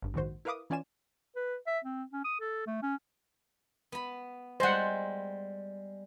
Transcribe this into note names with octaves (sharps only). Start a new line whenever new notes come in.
G#1 G2
A#1 D#2 G#2 D#3 F#4 C5
E4 A#4 B4 F5 D6 D#6
E3 C#4 F4 D5 G#5 E7
B4
E5
C4
C#4
D#6
A4
A3
C#4
B3 B5
G3 G#3 C5 F#5